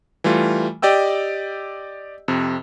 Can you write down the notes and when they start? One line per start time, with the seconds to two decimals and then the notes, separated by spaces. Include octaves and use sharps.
0.24 E3 G3 A3 F4
0.82 G4 D5 D#5 G5 E6
2.28 F2 C3